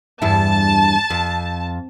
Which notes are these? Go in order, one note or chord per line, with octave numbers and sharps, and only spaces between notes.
E2 G2 E4 A5
F2